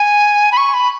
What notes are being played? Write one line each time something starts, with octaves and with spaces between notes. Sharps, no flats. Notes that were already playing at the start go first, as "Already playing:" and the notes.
Already playing: G#5
B5
C#6
B5